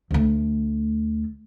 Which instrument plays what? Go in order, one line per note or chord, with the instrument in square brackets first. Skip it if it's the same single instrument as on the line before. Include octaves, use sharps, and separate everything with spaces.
[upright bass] D2 A3